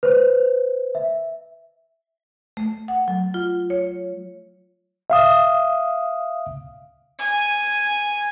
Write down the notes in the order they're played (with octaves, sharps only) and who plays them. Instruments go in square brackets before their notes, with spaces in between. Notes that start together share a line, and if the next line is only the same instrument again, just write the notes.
[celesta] B4 C5
E5
[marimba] A3
F#5
F#3
F4
C#5
[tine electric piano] E5 F5 D#6
[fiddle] G#5